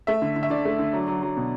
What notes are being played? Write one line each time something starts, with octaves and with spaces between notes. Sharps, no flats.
A3 E5
D3
D3
E5
D3 D5
A3
D3
F#3
F#3
F#3
B2